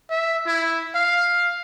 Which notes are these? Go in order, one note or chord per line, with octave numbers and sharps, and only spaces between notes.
E5
E4
F5